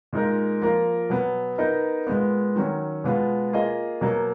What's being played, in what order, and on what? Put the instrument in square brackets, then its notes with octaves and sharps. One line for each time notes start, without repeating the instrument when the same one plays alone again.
[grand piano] A#2 G#3 D#4 A#4
F3 A#3 F4 A#4
B2 F#3 B3
B3 D#4 A#4 D#5
A#2 G#3 B3
D#3 F#3 C#4
B2 G#3 B3 F4
A#3 F4 G#4 D#5
B2 F#3 A#3